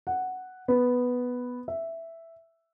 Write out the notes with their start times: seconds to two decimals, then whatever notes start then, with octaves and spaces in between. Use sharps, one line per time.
0.07 F#5
0.68 B3
1.68 E5